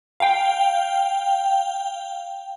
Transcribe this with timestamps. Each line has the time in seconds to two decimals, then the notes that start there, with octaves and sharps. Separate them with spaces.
0.20 F5 G5